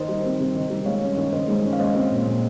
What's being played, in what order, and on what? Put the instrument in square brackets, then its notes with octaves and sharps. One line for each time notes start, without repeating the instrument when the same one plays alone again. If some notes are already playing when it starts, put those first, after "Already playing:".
Already playing: [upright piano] D#3 [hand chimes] C5 D#5
[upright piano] G3
C4
C3
D#3
G3
[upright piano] G#3 [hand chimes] C#5 F5
[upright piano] C#4
D#3
[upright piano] D#3 [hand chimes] C5 D#5
[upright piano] G#3
C#4
[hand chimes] F5
[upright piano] G#3 [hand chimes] C5 D#5
[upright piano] C4
A#2
A#2